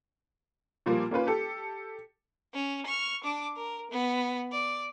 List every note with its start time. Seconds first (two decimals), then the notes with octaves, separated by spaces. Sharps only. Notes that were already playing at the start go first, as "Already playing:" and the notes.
0.86 A#2 F3 G3 A#3
1.11 A#3 C#4 F4 B4
1.27 G4 A4
2.54 C#4
2.86 C#6 F6
3.24 D4 D6
3.56 A#4
3.91 B3
4.52 D5